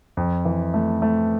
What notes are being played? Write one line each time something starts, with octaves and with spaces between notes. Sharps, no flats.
F2
E3
A3
A3